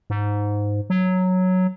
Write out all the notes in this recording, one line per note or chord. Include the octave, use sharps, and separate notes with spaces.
G#2
F#3